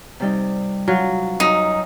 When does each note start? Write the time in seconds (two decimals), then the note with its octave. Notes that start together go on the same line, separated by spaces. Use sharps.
0.20 C3 G3 D#4
0.88 F#3 F4
1.40 F#2 D#4